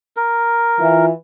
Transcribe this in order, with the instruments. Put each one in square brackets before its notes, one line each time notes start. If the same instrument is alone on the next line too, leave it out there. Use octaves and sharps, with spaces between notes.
[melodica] A#4
[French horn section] E3 F4